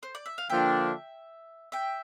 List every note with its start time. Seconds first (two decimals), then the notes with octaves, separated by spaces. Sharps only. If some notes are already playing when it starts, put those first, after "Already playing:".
0.03 C5
0.15 D5
0.26 E5
0.38 F5
0.50 D3 F3 A#3 D4 F4 E5 G5
1.72 E5 G5